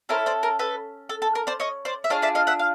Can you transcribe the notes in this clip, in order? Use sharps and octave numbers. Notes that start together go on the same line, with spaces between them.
C#4 E4 A4 A#4 C5
C5 D5
A#4
A4 B4
A4
A4
A#4
C5 D5
C#5 D#5
C5 D5
E5
D4 F4 G#4 C#5 D#5
D5 E5
D#5 F5
E5 F#5
F5